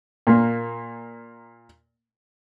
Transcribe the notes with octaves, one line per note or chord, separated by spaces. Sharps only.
A#2 A#3